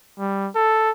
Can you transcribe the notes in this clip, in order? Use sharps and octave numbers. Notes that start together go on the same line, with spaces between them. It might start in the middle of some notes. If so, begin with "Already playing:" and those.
G3
A4